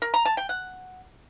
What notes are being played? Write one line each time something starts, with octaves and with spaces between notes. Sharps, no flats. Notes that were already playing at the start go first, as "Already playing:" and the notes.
A#4
A#5
A5
G5
F#5